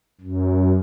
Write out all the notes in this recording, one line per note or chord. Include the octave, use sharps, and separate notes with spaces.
F#2